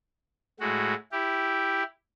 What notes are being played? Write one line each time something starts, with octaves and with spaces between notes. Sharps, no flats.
A2 G#3 F#4
E4 G4